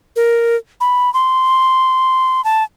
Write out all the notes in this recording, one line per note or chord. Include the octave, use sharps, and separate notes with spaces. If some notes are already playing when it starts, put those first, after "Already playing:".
A#4
B5
C6
A5